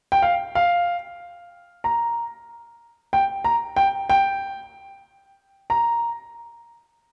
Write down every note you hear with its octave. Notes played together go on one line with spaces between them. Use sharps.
G5
F5
F5
A#5
G5
A#5
G5
G5
A#5